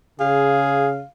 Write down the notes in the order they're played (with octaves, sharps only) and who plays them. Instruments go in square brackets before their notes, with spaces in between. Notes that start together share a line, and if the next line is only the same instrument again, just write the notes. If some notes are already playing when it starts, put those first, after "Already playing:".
[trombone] C#3 [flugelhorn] G#4 [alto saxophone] F5